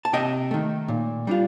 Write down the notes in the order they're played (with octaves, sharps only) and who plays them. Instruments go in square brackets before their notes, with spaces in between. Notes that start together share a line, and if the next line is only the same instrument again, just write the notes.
[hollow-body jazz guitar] A5
C3 D#5 G5
D#3 A3
A#2
G3 D4 F4